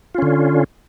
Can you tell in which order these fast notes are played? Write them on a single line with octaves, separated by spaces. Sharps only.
F4 C#4 D3